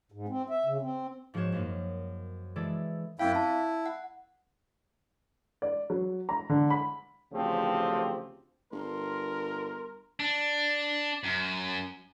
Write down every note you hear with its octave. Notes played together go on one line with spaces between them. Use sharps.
G#2
C4
E5
C#3
C4
G#2 F3 F#4 C5 C#5 E7
F#2 A#3 D#4
E3 G#3 A4 D5 E5
F#2 C4 E4 F5 G5
E4 A5
F#5
D5
F#3
A#5
D3
B5
A1 D2 C#3 F3 C4 G4
G1 A#4 C6
D4
F#2